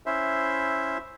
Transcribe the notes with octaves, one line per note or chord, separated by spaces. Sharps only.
C#4 E4 C5 E5